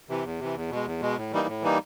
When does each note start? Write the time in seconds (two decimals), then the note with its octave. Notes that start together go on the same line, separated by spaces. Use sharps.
0.09 C3 E3
0.24 E2
0.40 C3 E3
0.55 E2
0.70 B2 G#3
0.86 E2
1.01 B2 G#3
1.17 A2
1.32 E3 G3 A#3 D#4
1.48 A2
1.62 E3 G3 A#3 D#4